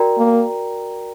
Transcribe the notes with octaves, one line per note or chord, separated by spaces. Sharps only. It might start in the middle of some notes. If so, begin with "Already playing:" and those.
Already playing: F#4 A#4 D5 G5 A#5
A#3